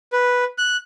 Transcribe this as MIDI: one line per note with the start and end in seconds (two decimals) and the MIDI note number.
0.12 0.45 71
0.58 0.77 90